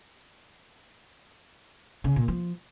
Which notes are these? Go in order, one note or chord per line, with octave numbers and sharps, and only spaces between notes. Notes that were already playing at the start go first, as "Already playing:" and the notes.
C#3
A#2
F3